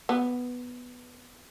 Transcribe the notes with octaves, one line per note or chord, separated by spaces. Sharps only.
B3